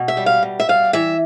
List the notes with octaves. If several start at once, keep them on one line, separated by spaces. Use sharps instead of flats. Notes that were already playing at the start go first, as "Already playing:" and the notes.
Already playing: B2
E5
G3
F5
B2
E5
G3 F5
E3 E5